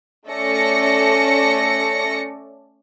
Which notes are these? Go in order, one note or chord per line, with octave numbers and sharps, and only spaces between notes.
A3 C#4 A4 D5 A#6 C#7